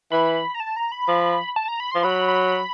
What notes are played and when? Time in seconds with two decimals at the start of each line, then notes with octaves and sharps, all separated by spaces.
0.12 E3 B5
0.55 A#5
0.60 A5
0.76 A#5
0.92 B5
1.08 F3
1.56 A5
1.68 A#5
1.80 B5
1.91 F3 C6
2.03 F#3 B5
2.28 B5